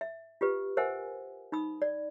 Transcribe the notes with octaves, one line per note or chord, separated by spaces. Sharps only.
E5
F4 G4 B4
A#4 C5 E5 F#5 G#5
D#4 B5 D#6
D5